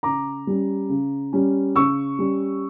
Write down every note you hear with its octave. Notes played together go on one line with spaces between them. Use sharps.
C#3 A#5 D6
G3 C#4
C#3
G3 C#4
C#3 C#6 E6
G3 C#4